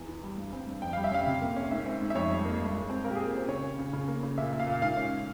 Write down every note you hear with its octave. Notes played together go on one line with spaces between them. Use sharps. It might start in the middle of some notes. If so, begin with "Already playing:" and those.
Already playing: E2
E3
G3
G2
C4
G2
F2 G5
G3 F5
E5
C#4 F5
C3
A#3
C#4
G#2 E5
C4
G#2
E5
F2 C#5
G3
A#3
G2
G#3
C4
A#2 A#4
G4
A#3 G#4
A#4
C#4 C5
C#3 C#5
C#4
C#3
C#3
A#3
C#3
A#2 E5
A#3
F5
A#2
G#2 F5
C#4